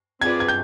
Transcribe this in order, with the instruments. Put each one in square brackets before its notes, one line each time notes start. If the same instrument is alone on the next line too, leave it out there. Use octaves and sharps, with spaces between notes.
[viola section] C4 F4 G#4 B4 D5 [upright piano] G#6
[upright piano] G#6
G6